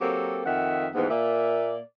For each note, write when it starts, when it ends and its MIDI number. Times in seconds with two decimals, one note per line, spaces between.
0.01 0.42 54
0.01 0.42 58
0.01 0.42 60
0.01 0.42 67
0.01 0.42 69
0.46 0.88 41
0.46 0.88 51
0.46 0.88 76
0.46 0.88 78
0.95 1.08 39
0.95 1.08 44
0.95 1.08 52
0.95 1.08 59
1.10 1.79 46
1.10 1.79 58
1.10 1.79 74
1.10 1.79 76